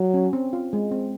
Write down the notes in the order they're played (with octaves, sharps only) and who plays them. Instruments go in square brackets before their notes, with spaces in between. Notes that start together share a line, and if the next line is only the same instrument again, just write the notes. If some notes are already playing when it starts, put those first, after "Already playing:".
Already playing: [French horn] F#3
[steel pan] C#4
C4
F4
G#3
C4